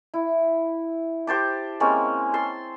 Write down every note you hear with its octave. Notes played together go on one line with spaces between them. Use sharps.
E4
G4 C5 A5 D6
G#3 A#3 C4 C#4
A5 C6 E6